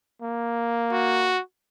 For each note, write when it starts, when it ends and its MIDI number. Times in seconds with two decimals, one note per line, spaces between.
0.22 1.38 58
0.92 1.41 66